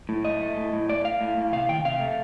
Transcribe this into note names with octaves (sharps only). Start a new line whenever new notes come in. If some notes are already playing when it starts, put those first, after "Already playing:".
A2
A3 D#5
A3
A2
A2
A3 D5
A3 F5
A2
A2
C3 F5
D#3 G5
C3 F5
A3